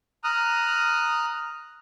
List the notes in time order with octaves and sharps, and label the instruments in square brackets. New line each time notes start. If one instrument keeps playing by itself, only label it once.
[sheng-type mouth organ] A#5 D#6 F6 F#6